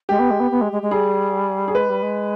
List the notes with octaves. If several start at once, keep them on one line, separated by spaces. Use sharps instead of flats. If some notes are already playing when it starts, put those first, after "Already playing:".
G#3 G4
B3
G#3
B3
B3
G#3
G#3
G#3
G3 G#4
G#4
G#3 B4
G3
G#3